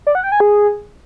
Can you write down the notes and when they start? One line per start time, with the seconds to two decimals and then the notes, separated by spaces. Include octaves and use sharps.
0.07 D5
0.15 F#5
0.23 G5
0.32 G#5
0.40 G#4